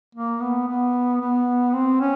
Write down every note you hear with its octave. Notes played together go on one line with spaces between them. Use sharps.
A#3
B3
B3
B3
C4
C#4